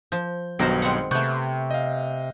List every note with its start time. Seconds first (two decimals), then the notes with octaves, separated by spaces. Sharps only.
0.12 F3 G6
0.59 B1 G2 B2 D#3 A#4 C5
0.82 G#3 C4 F#5
1.11 C3 A3 B3 C#6 F#6 G6
1.71 D#5 F5